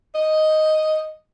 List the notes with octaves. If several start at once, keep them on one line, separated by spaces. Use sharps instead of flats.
D#5